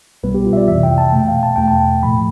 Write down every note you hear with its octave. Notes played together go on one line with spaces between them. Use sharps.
C2 B2 G3 B3 B4
G4
F4
E5
D5
F2 C3 E3 E5
G5
A5
B2 A3 G5
F5
A5
E2 B2 A3 G5
A5
A2 F3 A3 B5